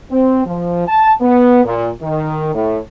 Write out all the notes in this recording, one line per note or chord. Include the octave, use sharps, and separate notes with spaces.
C4
F3
A5
B3
A#2
D#3
A2